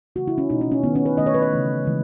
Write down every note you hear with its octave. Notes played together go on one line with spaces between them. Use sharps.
C#3 E3 A3 F#4
E4
C#4
B2 A3 D#4
C#4
C#4
D#3 A3 B3
C#4
B4
D#3 A3 D#5
C#5
B4
C#5
C#3 E3 A3
C#3 E3 G#3